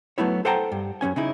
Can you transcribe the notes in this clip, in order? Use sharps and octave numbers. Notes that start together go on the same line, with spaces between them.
F#3 A3 B3 E4 C#5
A4 C5 F#5 G5 A5 A#5
G2
F#2 F3 C#4 G#5
C#3 D#4 E4